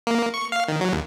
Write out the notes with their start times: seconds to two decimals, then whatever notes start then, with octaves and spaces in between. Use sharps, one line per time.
0.07 A#3
0.34 C#6
0.52 F5
0.68 D#3
0.81 F#3
0.93 D#2